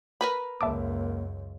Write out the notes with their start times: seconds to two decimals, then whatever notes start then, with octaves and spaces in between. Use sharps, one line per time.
0.21 A#4 B4 B5
0.61 C#2 F#2 A#3 E5 A5 D6